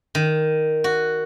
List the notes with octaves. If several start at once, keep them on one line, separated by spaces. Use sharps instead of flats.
D#3
F#4